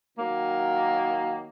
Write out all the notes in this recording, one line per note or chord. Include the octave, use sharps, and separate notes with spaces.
D#3 F#3 A#3